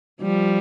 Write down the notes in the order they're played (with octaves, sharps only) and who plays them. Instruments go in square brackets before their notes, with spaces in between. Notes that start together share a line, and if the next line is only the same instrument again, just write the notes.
[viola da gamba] F3 G3